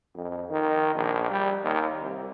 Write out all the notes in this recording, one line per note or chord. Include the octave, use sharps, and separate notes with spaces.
F2
D#3
A#1
G3
D#2
C2